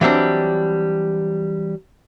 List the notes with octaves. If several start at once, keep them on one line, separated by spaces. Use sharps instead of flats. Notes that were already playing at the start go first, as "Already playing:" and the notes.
E3 F#3 G3 C4 D4